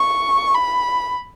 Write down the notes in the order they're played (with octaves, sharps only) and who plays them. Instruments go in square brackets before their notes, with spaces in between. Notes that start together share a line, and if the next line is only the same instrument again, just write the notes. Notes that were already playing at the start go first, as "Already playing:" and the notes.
Already playing: [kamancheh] C#6
B5